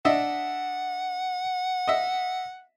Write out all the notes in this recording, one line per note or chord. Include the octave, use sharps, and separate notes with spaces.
D4 D#5 E5 F#5
D#5 E5